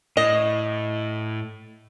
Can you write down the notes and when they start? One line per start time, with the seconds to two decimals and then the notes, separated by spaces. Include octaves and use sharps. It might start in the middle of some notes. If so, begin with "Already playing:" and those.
0.17 A2 D#5